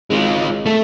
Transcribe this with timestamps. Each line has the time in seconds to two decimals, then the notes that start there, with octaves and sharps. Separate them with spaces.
0.10 G#1 G#3 F4
0.66 A3 A4